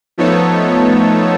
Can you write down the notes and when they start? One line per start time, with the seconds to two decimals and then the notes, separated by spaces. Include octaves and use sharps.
0.18 F3 A3 B3 D#4 A4 C#5